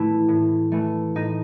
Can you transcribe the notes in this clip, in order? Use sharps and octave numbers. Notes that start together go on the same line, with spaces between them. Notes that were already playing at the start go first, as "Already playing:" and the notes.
Already playing: A2 E3 A3 E4
A2
E3 A3
A2 D#4